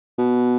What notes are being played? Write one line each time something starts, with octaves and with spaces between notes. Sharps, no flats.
B2